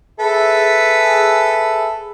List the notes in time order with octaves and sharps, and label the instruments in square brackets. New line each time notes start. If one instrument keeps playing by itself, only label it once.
[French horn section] G#4 [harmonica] A4 B4 E5